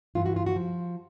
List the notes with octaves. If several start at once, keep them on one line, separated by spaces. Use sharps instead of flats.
G2 E3 F4
F#4
F4
F#4
F3